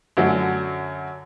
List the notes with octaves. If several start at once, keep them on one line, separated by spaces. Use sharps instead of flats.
F#2 D3 F#3